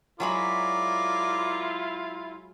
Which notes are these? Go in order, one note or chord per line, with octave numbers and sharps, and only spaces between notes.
F#3 G#3 E4 F4 A#4 D5 B5